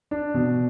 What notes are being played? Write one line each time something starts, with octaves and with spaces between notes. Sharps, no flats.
D4
B2